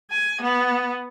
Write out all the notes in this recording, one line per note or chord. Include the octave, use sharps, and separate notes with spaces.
G#5
B3